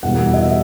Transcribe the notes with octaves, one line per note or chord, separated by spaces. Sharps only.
E2 B2 G3 A#3 F#5
D#5
E5